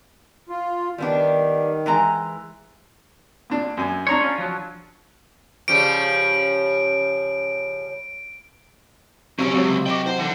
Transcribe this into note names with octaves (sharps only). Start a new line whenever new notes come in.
F4
D#3 G3 B3 D4
E3 G#3 A#5
A#2 D4
F#2 G#5
D4 C#5 A#5 C6
C#4 F4
F3 F#3
C#3 F3 G3 D7
F2 C3 F#3 C#4 C#6 E6 D7
C#2 C3 F#3
F#4 D#5 G5 D6
E4 C5 F#5
D3 E3